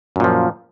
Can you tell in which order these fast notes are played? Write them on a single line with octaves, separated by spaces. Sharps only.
F#2 A#2 F3